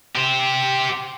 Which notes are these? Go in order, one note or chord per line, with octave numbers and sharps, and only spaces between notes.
G4 C5